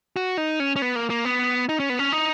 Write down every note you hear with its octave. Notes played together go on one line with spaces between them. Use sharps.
F#4
D#4
C#4
C#4
B3
A#3
A#3
B3
D#4
C#4
B3
C#4
D#4